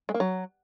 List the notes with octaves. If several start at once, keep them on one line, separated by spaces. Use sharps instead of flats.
G#3
A#3
F#3